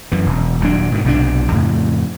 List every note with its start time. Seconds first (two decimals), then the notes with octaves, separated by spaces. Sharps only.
0.12 F#2 E3
0.26 E1
0.60 D#1 G2 F#3 D4
0.92 G#2 B2 D#3
1.04 B1 C3 G3 D4
1.52 F2 A2 C#3